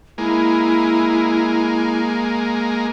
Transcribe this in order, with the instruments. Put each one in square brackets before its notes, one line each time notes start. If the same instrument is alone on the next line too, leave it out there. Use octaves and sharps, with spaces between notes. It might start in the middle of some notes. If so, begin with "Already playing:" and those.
[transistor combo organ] G#3 A#3 [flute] E4